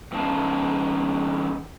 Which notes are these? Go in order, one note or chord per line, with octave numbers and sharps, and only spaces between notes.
E3 C#4 D#4 F5 A5